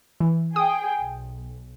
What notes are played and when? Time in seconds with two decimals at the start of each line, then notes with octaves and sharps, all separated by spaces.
0.20 E3
0.56 G#4 G5 D#6
0.99 B1